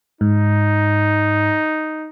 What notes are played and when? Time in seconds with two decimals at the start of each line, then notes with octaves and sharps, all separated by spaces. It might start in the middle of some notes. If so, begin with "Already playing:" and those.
0.21 G#2 D#4